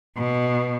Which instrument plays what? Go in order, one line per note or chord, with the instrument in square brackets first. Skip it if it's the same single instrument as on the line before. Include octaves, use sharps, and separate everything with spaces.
[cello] B2